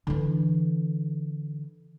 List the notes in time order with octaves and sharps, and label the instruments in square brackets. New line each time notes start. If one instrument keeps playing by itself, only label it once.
[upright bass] D3 E3